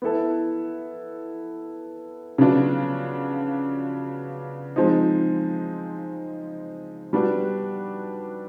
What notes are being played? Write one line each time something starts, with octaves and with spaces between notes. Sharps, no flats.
B3 E4 A4
C#3 F#3 B3 D4 F4
F3 G#3 C4 D#4
G3 B3 D4 F#4 B4